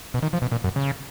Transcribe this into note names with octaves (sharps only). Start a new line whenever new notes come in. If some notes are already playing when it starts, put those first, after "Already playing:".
B2
D#3
F3
B2
A#2
F#2
C#3